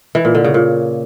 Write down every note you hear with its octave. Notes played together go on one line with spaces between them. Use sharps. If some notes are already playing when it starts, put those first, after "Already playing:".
E3
A#2
D3
C#3
A#2